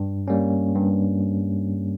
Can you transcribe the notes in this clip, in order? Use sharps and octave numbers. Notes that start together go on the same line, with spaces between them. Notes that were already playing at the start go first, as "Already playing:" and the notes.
Already playing: G2
G3 A#3 C#4
G2